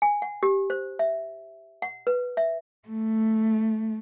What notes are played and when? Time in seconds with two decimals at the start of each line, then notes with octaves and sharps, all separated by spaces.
0.02 G#5
0.22 F#5
0.43 G4
0.70 C5
0.99 E5
1.82 F#5
2.07 B4
2.37 E5
2.88 A3